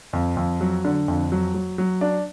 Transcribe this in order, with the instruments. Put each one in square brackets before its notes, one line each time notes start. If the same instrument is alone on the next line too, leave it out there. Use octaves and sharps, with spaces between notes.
[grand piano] F2
F2
F#3
D3
F2
F#3
F#3
F#3
D4